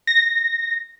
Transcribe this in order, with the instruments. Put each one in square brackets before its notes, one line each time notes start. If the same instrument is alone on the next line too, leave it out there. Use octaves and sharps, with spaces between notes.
[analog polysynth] A#6